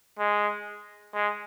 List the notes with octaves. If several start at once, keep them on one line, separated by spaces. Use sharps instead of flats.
G#3
G#3